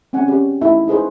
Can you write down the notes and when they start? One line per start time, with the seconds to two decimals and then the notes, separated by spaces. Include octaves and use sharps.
0.13 C4 C#4 F#5 G#5
0.28 C#4 G4
0.61 A3 D#4 E4 E5 A5
0.88 D#4 G#4 B4 C5